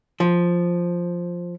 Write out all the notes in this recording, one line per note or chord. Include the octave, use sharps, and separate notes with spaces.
F3